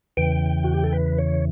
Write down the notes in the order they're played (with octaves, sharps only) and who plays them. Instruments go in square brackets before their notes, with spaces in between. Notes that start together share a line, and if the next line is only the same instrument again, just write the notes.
[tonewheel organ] E2 C#3 E3 G5
F#4
G4
A4
B4
C#5